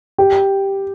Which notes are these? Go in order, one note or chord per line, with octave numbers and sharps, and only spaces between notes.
G4